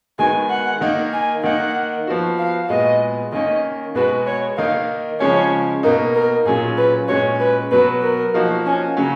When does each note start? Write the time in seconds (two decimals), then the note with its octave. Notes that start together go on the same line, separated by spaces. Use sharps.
0.19 D#3 G#3 B3 F#4 G#5
0.50 F#5
0.81 D#3 A#3 D#4
1.13 G#5
1.43 D#3 A#3 D#4 F#5
2.07 F3 B3 F#4
2.39 F5
2.69 A#2 G#3 B3 F#4 D#5
3.32 D#3 A#3 C#4 D#5
3.95 B2 G#3 B3 F#4 B4
4.27 C#5
4.57 D#3 A#3 D#4 F5
5.20 C#3 F3 G#3 C#4 C#5
5.83 B2 A#3 D#4 A#4
6.15 A#4
6.45 A#2 F#3 C#4 F4 G#4
6.77 B4
7.08 A#2 G#3 C#4 F#4 C#5
7.40 B4
7.71 B2 F#3 B3 B4
8.02 A#4
8.34 F3 A#3 D#4 F#4
8.66 C#4
8.97 C#3 F#3 C#4